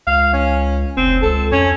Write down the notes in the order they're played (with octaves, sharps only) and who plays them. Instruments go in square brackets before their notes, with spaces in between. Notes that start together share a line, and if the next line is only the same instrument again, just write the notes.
[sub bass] C#2 [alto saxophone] F5
[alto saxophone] C#4
[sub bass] F1 [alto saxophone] C4
[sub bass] C#2 [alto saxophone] A4
[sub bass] F2 [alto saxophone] C#4